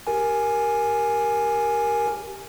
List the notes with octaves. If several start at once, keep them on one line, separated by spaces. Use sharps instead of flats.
G4 A#4 G#5